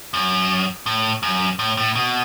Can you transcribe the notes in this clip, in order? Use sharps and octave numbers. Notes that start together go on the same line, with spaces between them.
F#2
A2
F#2
A2
A2
B2